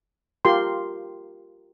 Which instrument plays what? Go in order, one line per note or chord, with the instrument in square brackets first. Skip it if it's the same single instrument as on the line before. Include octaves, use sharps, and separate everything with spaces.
[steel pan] F4 G4 A#4 C6